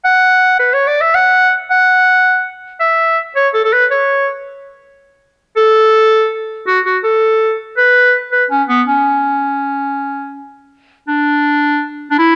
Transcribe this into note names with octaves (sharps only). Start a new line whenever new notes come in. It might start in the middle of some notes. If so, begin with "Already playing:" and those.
F#5
B4
C#5
D5
E5
F#5
F#5
E5
C#5
A4
A4
B4
C#5
A4
F#4
F#4
A4
B4
B4
C#4
B3
C#4
D4
D4
E4